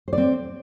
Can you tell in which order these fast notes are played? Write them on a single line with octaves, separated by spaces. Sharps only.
C5 D5 C4